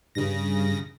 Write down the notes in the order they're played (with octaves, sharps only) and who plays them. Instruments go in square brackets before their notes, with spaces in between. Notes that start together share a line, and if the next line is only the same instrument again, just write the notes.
[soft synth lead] G2 [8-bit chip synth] C#3 A#6